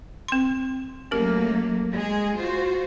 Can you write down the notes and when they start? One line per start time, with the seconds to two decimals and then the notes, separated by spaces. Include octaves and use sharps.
0.28 C4 C6
1.11 F#3 A3 A#3 C#4 G4 A#4
1.94 G#3 G#4
2.38 F4 F#4 C5